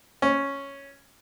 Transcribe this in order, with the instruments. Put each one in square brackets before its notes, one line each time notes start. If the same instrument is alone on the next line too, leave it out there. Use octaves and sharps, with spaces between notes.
[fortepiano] C#4